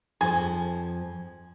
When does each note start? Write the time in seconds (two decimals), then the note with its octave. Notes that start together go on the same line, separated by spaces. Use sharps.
0.21 F2 F3 G#4 C5 G#5